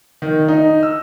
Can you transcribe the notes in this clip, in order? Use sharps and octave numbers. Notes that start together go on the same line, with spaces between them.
D#3
D#4
E6